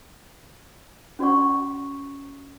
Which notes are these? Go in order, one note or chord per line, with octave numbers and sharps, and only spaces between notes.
C#4 F#4 D5 F#5 C#6